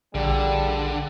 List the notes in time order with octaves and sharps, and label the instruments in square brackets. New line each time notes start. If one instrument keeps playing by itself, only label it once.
[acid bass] A#1 [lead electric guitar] D3 [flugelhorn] G3 [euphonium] G#4